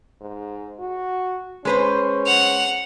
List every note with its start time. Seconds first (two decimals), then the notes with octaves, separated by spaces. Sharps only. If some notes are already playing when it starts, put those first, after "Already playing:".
0.21 G#2
0.80 F#4
1.65 G#3 C#4 B4 C5
2.27 F#5 F7